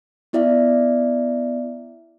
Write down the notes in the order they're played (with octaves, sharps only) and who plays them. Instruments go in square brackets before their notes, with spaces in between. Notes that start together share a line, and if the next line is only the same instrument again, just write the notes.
[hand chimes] B3 E4 D5 E5 F5